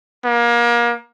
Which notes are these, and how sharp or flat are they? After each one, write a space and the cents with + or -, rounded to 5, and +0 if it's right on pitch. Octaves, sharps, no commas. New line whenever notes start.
A#3 +30